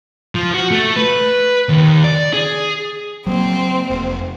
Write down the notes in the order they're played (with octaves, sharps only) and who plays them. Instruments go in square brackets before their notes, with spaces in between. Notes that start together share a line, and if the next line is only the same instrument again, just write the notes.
[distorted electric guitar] F3
F#4
A3
B4
D#2
D5
G#4
[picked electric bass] F#3 G#3 A#3 [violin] C4
[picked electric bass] F1